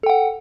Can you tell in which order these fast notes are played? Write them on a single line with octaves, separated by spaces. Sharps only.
A4 G5 F#5